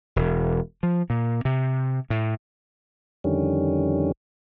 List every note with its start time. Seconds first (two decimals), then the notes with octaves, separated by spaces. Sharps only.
0.16 E1
0.83 F3
1.10 A#2
1.45 C3
2.10 A2
3.24 F2 D3 D#3 G3 C#4